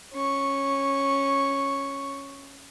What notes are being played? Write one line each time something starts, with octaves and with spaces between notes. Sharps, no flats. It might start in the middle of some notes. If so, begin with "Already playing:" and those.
C#4 C#6